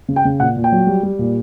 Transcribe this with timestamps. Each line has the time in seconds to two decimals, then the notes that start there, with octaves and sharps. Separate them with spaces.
0.08 C#3
0.16 G5
0.25 C#3
0.40 A#2 F#5
0.56 A#2
0.64 G5
0.72 F#3
0.87 G3
1.03 G3
1.19 A#2